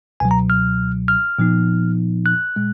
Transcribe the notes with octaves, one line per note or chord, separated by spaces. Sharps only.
C#2 B2 F#3 G#5
A#5
F6
F6
A#2 F3 B3 D#4
F#6
A#2 G#3